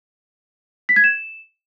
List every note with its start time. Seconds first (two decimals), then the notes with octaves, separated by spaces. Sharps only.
0.89 B6
0.96 G#6
1.04 E7